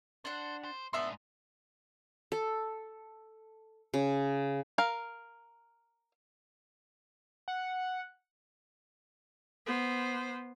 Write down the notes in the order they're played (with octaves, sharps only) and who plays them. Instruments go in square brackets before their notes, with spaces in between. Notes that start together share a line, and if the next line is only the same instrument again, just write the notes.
[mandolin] D4 F#5 [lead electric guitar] C5
[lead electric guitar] C5
[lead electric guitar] G#2 D4 [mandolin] B3 E5 C6
[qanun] A4
C#3
[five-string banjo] A#4 F5
[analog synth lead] F#5
[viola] B3 C5